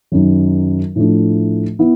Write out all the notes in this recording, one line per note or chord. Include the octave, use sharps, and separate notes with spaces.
F#2 D#3 F#3
A2 F3 A3 D4
B3 E4